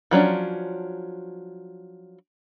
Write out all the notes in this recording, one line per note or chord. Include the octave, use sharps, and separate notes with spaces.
F3 F#3 C#4 D4